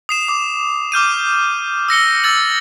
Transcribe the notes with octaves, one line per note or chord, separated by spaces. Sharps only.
D#6 C7 E7
D6
D6 F6 G6 D#7
E6 A#6 C#7 G7
E6 A6 F#7